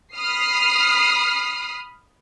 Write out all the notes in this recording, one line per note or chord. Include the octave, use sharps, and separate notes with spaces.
B5 D#6 F6 C7